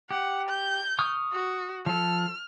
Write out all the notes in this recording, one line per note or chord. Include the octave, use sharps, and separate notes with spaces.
G4 F#5
G6
C#6 D#6 F6
F#4
F3 A4 F6